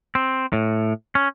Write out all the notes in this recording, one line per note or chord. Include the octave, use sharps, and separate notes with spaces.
C4
A2
C#4